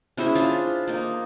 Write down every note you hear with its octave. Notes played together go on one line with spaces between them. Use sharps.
C#4 E4 G#4 C5
D4 F4
A#3 D#4